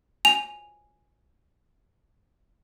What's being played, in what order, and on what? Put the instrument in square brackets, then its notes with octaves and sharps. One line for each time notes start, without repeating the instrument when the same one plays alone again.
[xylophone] G#5 F7